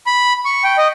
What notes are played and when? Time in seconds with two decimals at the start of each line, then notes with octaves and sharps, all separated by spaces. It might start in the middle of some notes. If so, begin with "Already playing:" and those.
0.07 B5
0.45 C#6
0.64 G5
0.78 D#5